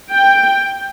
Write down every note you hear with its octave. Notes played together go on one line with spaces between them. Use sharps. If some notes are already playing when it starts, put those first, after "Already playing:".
G5